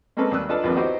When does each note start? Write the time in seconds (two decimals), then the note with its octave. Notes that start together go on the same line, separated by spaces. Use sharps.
0.17 G#3 A#3 C4 C#4 A4 B4
0.31 D#2 G3 D#6 E6 F#6
0.49 D4 D#4 F4 A4 B4 A5
0.64 A#1 D#2 A#2 F3 C4 B4
0.75 B3 D#4 E4 F#4 G4 C5